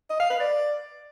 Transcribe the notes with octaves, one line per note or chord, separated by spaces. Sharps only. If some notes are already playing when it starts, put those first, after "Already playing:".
D#5
F5
B4
D5